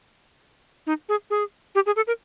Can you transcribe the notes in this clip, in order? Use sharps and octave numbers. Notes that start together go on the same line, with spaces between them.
D#4
G#4
G#4
G4
G#4
A4
A#4